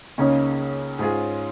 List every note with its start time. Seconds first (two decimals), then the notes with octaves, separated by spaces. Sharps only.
0.18 C#2 C#3 A#3 C#4 D#4
0.99 G#2 G#3 F4 G#4